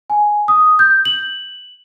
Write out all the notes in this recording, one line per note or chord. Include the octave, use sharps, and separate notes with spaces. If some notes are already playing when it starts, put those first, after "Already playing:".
G#5
D#6
G6
F#7